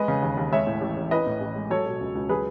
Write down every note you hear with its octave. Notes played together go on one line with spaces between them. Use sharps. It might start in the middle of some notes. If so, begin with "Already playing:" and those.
Already playing: G#3 B4 D#5
C#3
D#2
D#2
G#3 C#5 E5
A2
A1
A1
E3 B4 D#5
A2
A1
G#3
F#3 A4 C#5
B2
C#2
C#2
F#3 G#4 B4